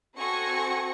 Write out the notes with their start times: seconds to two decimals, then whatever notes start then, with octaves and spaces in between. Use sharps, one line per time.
0.16 C4 F#4 A4 G#5 C#6 A#6